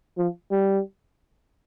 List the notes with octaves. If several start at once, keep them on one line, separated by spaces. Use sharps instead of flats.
F3
G3